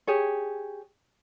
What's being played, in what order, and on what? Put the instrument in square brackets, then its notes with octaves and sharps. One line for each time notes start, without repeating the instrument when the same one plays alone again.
[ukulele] G4 G#4 C#5